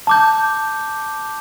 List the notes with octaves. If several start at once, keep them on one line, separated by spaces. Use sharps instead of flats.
A5 D6 G6